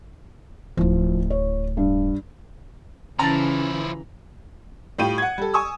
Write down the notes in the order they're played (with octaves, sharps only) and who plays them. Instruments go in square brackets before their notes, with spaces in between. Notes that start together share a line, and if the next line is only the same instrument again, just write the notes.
[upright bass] D1 E4 [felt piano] F3
[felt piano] C#5
G2
[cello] C#3 E3 [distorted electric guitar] F3 E4 [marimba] C#4 A5 A6 [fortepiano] A#5
[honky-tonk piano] A2 G3 F4 G5 D#7
F#5 G#6
G3 A4
G#5 C#6 D#6 E6